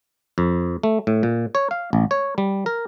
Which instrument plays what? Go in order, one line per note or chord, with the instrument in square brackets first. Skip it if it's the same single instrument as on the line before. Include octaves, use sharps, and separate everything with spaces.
[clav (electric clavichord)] F2
A3
A2
A#2
C#5
F5
A1
C#5
G3
A#4